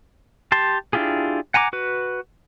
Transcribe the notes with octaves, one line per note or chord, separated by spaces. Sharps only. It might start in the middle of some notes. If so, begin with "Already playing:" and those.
G4 A5 C6
D4 E4 F4 G4 G#4
F#5 G#5 A#5 C6 D6
F#4 B4